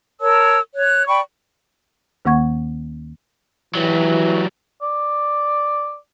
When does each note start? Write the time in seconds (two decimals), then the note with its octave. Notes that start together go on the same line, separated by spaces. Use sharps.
0.20 A#4 C#5 A5 E6
0.74 C#5 F#6
1.07 D5 G5 B5 C#6
2.25 D#2 D#3 A#3 F#5 C#6 G#6
3.75 E3 F#3 G3
4.82 D5